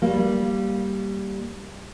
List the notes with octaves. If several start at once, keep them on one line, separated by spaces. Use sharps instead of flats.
G3 A#3